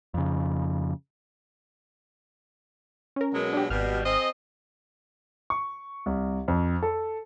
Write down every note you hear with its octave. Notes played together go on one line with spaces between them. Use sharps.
F2 C#3
C#4 A#4
B2 F#3 G#3
D4 G4
G#1 B2 G3 F6
C4 G#4 D#5
C#6
C2
F2
A4